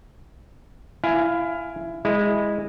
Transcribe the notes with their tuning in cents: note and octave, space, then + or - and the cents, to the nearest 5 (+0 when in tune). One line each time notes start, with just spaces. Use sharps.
E4 +20 F5 +0 G#5 +0
G#3 -15 E4 -10